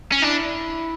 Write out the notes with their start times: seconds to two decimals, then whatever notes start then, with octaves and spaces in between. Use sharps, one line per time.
0.12 C#4
0.22 D4 E4